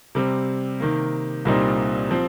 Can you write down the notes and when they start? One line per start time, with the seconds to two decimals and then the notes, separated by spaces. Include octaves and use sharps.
0.15 C3 G3 C4
0.80 C3 D#3 A#3
1.45 C2 A#2 G3 C4 D#4
2.11 F3 C4